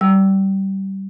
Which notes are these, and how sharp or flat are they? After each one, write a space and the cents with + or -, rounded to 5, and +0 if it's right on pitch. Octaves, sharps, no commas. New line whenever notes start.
G3 -20 E6 +0